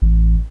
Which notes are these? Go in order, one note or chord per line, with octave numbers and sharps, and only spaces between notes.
A1